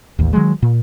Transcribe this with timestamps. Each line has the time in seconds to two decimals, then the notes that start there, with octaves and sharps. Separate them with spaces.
0.19 A1 D#2
0.33 D#3 F#3 G#3
0.62 A#2